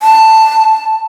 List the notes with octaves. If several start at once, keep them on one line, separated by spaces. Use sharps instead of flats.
A5